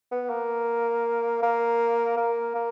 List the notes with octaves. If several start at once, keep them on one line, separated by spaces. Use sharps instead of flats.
B3
A#3
A#3
A#3
A#3